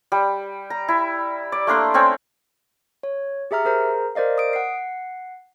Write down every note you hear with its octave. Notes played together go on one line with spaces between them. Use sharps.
G3
A#5
E4
D5
A3 A#3 D4 C6
A3 C4 C#4 C#5
C#5
G4 G#4 E5 A#5 F6
G#4 A#4 C5 A#5
A#4 C5 D5 D#5 F5
D#6 D7
F#5 C7